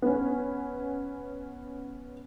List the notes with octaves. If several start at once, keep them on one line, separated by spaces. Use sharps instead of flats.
B3 C#4